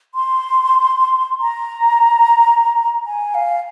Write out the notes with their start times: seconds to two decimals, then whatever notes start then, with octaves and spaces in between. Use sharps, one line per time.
0.15 C6
1.40 A#5
3.06 G#5
3.34 F5